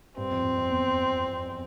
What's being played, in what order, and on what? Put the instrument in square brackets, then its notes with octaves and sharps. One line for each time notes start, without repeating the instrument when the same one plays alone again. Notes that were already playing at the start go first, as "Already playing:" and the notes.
[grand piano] G2 [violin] C4
[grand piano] F2
F2
F2
E2